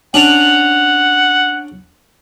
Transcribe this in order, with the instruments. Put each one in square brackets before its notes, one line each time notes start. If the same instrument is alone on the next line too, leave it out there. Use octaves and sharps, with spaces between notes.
[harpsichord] C#4 D4 [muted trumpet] F#5 [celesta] F7 F#7